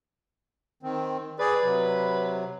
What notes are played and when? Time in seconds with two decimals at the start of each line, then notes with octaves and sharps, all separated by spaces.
0.83 D#3 C4
1.39 G#4 B4 D5
1.63 C3 F#3